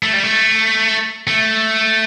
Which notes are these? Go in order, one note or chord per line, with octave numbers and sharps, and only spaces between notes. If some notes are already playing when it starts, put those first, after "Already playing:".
A3
G3
A3
A3